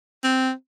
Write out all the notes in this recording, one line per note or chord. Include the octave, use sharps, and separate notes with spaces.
C4